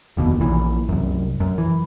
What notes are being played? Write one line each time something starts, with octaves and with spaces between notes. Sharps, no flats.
F1 D#2 B2
A#1 A#2 E3
C2 F#2
F#2
E3